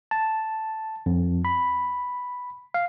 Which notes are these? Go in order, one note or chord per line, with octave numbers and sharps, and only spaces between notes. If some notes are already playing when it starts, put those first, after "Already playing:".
A5
F2
B5
F5